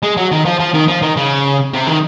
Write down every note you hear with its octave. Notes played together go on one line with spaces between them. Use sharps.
G#3
F#3
D#3
F3
F3
D#3
F3
D#3
C#3
C3
D#3